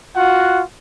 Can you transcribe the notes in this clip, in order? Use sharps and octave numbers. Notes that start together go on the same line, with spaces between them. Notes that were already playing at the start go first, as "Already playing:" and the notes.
F4 F#4 F#5